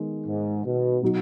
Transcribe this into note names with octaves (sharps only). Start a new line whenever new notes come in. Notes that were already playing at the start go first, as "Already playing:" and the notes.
Already playing: D#3 G#3 B3
G#2
B2
B2 F#3 D#4 F#4